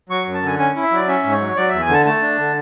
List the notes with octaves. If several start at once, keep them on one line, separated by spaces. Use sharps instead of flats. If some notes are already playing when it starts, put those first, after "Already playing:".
F#3 C#6
F#2
A5
D3 G#5
C#4 G#5
E4
E5
F#3 D5
C#4 E5
G#2
C#5
F#3
F#3 D5
E2 E5
G#5
D3 A5
A3 A5
D4
D3